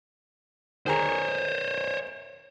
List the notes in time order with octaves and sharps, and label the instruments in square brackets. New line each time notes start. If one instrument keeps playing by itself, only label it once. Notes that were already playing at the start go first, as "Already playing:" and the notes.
[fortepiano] D#3 G#4 A#5 [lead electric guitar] C5 C#5